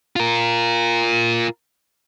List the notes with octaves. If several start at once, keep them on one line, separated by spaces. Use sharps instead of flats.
F4 A#4